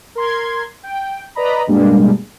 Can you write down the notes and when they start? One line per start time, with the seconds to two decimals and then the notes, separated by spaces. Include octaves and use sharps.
0.15 A#4 C6 G#6
0.83 G5
1.35 B4 D5 D#5 A#5 B5
1.67 G2 B2 G3 G#3 A#3 D4